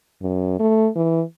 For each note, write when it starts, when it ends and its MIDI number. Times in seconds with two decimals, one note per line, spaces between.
0.22 0.58 42
0.59 0.89 57
0.96 1.23 52